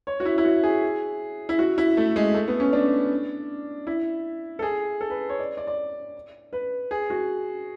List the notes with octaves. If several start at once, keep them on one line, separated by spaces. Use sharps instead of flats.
C#5
F#4
E4
E4
F#4
G#4
E4
F#4
E4
A3
G#3
A3
B3
C#4
D4
E4
A4
G#4
A4
B4
C#5
D5
D5
D5
B4
G#4
F#4